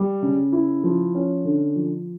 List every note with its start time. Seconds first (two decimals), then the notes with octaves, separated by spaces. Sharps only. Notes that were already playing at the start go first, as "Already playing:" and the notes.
Already playing: G3
0.22 C#3
0.52 E4
0.84 F3
1.15 C#4
1.45 D3
1.76 F3